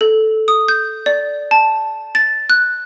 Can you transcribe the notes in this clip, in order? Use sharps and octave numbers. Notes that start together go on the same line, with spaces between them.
A4
D#6
G6
D5
A5
A6
F#6